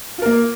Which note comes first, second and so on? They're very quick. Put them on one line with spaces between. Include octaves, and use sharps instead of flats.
F4 A#4 A#3